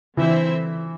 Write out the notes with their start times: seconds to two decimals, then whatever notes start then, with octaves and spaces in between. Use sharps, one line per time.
0.17 D3 E3 C4 E4 C5 E5